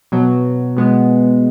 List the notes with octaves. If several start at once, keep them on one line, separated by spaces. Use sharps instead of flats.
B2 F#3 B3
B2 G#3 B3